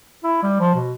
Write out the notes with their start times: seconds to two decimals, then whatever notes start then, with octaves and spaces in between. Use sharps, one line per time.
0.24 E4
0.43 G3
0.60 F3
0.75 B2